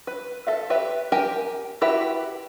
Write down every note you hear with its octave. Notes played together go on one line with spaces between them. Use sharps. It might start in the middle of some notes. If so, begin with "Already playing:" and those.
B4
A4 E5 F5
G4 B4 E5
G4 A#4 G5 G#5
E4 F#4 G4 B4 E5